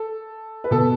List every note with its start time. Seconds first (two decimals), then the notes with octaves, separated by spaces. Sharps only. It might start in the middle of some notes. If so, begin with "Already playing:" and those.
Already playing: A4
0.64 B4
0.71 B2 A4